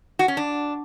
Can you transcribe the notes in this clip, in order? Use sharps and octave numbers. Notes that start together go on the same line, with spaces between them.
F#4
C#4
D4